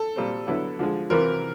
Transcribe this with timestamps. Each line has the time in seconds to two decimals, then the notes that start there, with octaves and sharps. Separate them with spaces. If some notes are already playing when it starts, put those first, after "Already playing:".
Already playing: A4
0.16 A#2 G3 C4
0.47 D3 F#3 B3 E4
0.79 D3 F3 G#3
1.10 C3 E3 G3 C4 F4 A#4